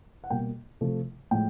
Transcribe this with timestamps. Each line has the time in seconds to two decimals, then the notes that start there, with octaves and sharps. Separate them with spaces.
0.24 F#5
0.30 B2 G3 A#3 G5
0.81 C3 F3 A3
1.31 A2 F3 G#3 G5